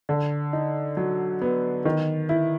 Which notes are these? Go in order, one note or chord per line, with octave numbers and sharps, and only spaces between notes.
D3
D#4
F#3
B3
D#3
E4